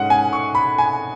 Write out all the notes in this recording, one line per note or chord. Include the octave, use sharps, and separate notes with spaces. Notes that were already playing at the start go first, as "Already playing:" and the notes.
Already playing: G#2 G#3 C#4 F#5
G#5
C#6
B5
G#5